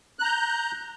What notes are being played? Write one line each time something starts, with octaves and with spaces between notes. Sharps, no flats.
A#5 F#6 G6